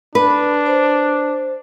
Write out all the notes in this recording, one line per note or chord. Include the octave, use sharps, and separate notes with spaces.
D4 B4
C5